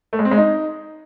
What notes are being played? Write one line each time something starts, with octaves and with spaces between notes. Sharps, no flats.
A3
G#3
C4
G#3
D#4